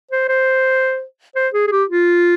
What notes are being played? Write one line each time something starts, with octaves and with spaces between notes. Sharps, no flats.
C5
C5
C5
G#4
G#4
G4
F4